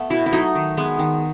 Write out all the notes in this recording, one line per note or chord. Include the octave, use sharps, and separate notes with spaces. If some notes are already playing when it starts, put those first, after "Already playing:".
Already playing: A3 B3
B2 E4
E4
F#3 A3 D#4
D#3
G#3 B3
D#3